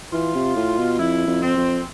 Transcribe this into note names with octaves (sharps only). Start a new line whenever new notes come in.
E3 F4
C3
A2
B2
F2 E4
F2
C4
F2